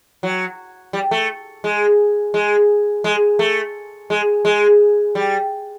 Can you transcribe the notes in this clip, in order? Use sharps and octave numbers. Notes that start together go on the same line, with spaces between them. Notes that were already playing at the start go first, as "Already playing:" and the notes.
F#3
G3
A3
G#3
G#3
G#3
A3
G#3
G#3
G3